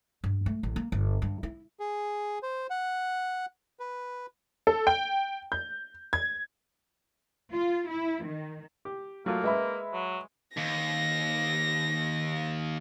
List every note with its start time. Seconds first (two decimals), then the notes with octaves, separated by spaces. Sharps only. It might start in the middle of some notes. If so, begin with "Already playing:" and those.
0.24 G2
0.46 A3
0.63 A1
0.76 A#3
0.92 G1
1.22 G2
1.43 E4
1.80 G#4
2.43 C5
2.70 F#5
3.80 B4
4.67 A4
4.87 G5
5.52 G6
6.13 G#6
7.53 F4
7.88 E4
8.24 D#3
8.85 G4
9.26 F#3 A3 A#3 F4
9.44 G#3 B4 E5 B5
9.93 F#3
10.57 D#2 A#6